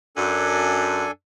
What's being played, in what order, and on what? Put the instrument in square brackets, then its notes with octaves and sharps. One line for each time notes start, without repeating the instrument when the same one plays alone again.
[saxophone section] F#2 [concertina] D4 A4 G#5